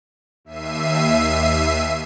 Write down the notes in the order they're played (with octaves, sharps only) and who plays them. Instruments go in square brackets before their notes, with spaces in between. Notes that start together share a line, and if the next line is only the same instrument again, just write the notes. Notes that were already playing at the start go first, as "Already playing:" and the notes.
[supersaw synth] D#2 E5 C7 D#7